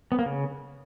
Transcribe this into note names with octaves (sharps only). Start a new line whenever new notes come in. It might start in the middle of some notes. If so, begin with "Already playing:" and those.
B3
A#3
C#3